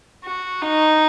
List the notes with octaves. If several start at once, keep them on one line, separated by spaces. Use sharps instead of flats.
F#4
D#4